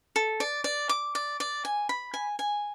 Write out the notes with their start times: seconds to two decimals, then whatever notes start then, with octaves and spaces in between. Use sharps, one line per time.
0.16 A4
0.40 D5
0.64 D5
0.89 D6
1.15 D5
1.40 D5
1.65 G#5
1.89 B5
2.14 G#5
2.39 G#5